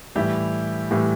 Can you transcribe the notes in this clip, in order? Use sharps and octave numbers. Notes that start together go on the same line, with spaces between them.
A2 E3 G3 E4 G4
A2 E3 G3